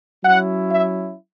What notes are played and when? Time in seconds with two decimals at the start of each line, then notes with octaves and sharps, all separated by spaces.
0.23 F#3 C#4 E4 F#5
0.69 E5